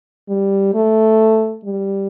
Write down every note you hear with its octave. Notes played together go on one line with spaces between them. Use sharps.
G3
A3
G3